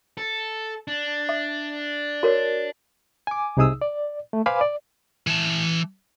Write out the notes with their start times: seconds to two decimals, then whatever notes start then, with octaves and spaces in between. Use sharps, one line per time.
0.17 A4
0.88 D4
1.29 E5
2.23 F#4 A#4 C#5
3.27 G#5 D6
3.57 C2 C3 D#4 G#4 D#6 E6
3.82 D5
4.33 A3
4.46 B4 C5 F5 G#5 B5 D6
4.61 D5
5.27 E3 A5